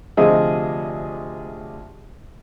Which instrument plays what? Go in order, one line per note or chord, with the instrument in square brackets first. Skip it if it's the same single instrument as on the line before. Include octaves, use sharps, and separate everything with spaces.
[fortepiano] D2 C3 F3 G#4 D#5 E5